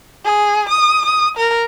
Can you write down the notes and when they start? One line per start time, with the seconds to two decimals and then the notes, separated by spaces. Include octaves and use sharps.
0.25 G#4
0.69 D#6
1.05 D#6
1.37 A#4